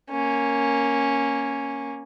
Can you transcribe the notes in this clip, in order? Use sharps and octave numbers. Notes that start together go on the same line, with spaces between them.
A#3 C#4